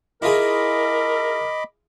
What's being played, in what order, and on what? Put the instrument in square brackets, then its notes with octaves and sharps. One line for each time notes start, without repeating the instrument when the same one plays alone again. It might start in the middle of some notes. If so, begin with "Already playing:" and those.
[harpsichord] E4 F4 G#4 [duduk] A#4 [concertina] D#5 B5 D6